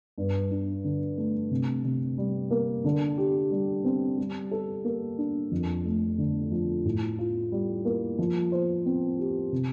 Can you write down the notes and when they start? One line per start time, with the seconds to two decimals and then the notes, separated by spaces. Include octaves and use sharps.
0.18 G2
0.51 D4
0.84 D3
1.18 A3
1.51 C3
1.84 C3
2.18 G3
2.51 A#3
2.84 D3
3.18 G4
3.51 G3
3.84 C4
4.18 G3
4.51 A4
4.84 A#3
5.18 D4
5.51 F2
5.85 A3
6.18 D3
6.52 F3
6.85 A2
7.18 F4
7.52 G3
7.85 A#3
8.19 F3
8.52 C5
8.86 C4
9.19 G4
9.52 C3